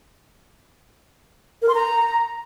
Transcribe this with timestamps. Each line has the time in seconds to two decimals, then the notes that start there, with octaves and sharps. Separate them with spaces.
1.62 A#4
1.68 C6
1.75 A#5